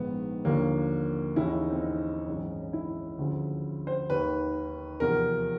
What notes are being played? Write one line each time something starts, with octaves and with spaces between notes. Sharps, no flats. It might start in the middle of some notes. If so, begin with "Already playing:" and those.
Already playing: A#1 G#2 D#3 B3
D#2 D3 F3 A#3
D#2 C#3 E3 E4
D#4
C4
D#4
G#1 F#2 C#3 E3
E4
D2 C#3 F3
C5
D#2 D#3 B4
E2 C3 F3 A#4